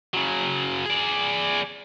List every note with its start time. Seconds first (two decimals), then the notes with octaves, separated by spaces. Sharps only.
0.14 C#3 F#3
0.86 G#4 D5